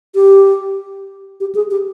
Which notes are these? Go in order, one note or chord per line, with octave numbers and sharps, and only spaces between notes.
G4
G4
G#4
G4